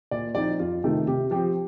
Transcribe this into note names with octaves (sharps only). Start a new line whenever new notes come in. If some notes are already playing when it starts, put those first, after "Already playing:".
A#2 D5
F3 C4 D#4 D5
F2 F4
C3 D#3 A3
C3 G4
F3 C4 G4